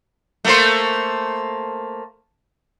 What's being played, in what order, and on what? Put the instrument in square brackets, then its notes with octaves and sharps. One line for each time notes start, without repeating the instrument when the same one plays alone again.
[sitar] A3 A#3 C5